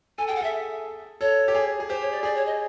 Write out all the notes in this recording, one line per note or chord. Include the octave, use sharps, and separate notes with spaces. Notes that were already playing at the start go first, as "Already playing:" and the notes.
A4 G#5
G#4 G5
F#5
A4 E5
A4 C#5
G4
G#4
G#4
G4 C5
C#5
D5
G#4 D5
C#5
D#5